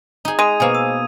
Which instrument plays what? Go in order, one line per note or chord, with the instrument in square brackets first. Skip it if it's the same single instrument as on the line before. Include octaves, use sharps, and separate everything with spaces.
[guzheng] D#4 G#4
[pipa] G#3 [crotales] D#6 G#6 D#7
[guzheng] B2 A#3 [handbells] B4 C5 G#5
[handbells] E6